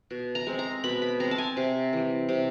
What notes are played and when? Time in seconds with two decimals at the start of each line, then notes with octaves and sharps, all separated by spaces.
0.11 B2
0.35 A#5
0.47 G#3 C4
0.59 A#5
0.84 B2 B5
1.02 B5
1.20 G#3 C4 A#5
1.31 A5
1.38 G#5
1.57 C3
1.93 E3 G3
2.29 C3